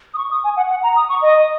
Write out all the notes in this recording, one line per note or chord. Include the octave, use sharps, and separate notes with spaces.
D#6
C#6
D#6
G#5
F#5
F#5
A#5
D#6
C#6
D#5